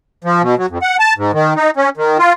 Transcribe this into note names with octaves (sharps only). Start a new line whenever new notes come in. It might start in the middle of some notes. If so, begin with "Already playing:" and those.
F3
B2
F#3
F2
F#5
A5
G#2
D#3
D#4
C#4
D#3
F4